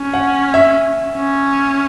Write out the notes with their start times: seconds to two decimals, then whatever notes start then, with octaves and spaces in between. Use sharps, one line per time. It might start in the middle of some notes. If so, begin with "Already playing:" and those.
Already playing: C#4
0.14 F#5
0.54 E5
1.15 C#4